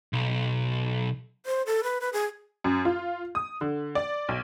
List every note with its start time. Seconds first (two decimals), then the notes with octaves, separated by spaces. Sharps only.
0.13 B1
1.46 C5
1.66 A4
1.83 B4
2.01 B4
2.13 G#4
2.64 F#2
2.85 F4
3.35 D#6
3.61 D3
3.95 D5
4.29 B1